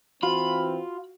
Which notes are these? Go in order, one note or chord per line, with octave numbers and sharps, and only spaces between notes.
E3 C4 F4 F#4 B5